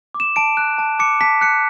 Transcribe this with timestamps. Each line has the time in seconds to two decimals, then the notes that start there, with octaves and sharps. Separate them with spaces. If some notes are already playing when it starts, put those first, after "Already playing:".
0.14 D6
0.20 E7
0.36 A5 D7
0.57 F#6
0.78 A5
0.99 D6 C#7
1.21 A5 B6
1.41 F#6 C#7